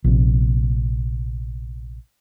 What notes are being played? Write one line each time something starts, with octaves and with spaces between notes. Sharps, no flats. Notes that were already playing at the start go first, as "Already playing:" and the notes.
A#1 C3